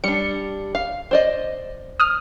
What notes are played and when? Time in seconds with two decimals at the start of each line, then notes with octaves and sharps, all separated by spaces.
0.04 G3 D4 C#7
0.75 F5
1.11 C5 D5 D#5
2.00 D#6 F6